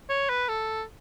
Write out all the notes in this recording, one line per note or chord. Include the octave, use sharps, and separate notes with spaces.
C#5
B4
A4